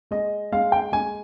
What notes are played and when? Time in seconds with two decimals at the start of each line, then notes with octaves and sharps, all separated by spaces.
0.11 G#3 D#5
0.52 G#3 F5
0.72 G5
0.92 G#3 G#5